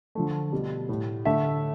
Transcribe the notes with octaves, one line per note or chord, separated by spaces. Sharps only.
D3 F3 A3
B2 G3
A2 G3
D3 A3 E5